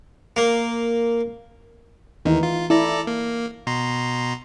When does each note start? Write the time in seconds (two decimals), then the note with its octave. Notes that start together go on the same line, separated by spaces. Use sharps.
0.36 A#3
2.25 D#2 D#3 E3 D#4
2.43 F4
2.70 E4 A4 D5 A#5
3.07 A#3
3.67 B2 A#5 C6